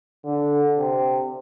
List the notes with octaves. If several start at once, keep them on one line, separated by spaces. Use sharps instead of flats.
D3
C3